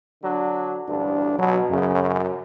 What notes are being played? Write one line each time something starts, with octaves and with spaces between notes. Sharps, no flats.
D3 F#3 D4
A1 D2 G2 D4
B2 F#3
F#2 C#3